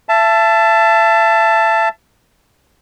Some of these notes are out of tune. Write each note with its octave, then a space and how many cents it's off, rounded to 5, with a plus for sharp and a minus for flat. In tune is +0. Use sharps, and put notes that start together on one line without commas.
E5 +35 A5 +0